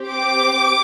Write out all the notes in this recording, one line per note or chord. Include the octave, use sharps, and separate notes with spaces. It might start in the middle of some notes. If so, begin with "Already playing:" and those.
Already playing: C4 G4
D6